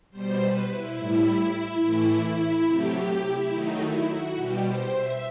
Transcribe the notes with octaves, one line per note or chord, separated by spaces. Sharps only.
B2 G3 C5
B4
E4
A2 G3
A2 E3 A3 E4
E4
C3 F#3 A3 G4
G4
E4
D#3 F#3 A3 D#4
E4
F#4
B2 G3 G4
C5
E5